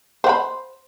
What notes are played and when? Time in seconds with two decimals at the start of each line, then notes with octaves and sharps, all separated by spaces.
0.24 C5
0.27 F#5
0.29 B5